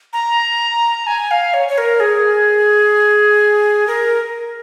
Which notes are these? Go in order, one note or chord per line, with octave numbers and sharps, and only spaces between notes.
A#5
G#5
F5
C#5
C#5
A#4
G#4
A#4